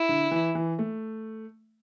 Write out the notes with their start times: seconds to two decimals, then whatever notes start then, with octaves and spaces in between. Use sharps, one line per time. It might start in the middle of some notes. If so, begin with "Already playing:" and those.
Already playing: E4
0.09 D3
0.31 E3
0.55 E3
0.79 A3